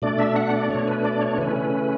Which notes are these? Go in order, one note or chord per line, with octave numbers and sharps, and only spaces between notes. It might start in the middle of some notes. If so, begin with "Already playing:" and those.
B2 A3 D4 D5
E5
F#5
D5
B2 A3 D4 C#5
B4
D5
C#5
C#3 E3 A3 C#4 B4